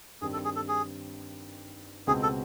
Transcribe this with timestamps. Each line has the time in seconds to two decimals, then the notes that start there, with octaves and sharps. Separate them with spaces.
0.22 G2 D#3 G3 C4 G#4
0.33 A4
0.45 G#4
0.56 A4
0.68 G#4
2.07 C#2 B2 G#3 C4 G#4
2.23 A4